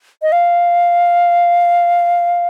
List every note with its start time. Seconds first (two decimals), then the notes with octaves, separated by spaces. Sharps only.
0.22 D#5
0.32 F5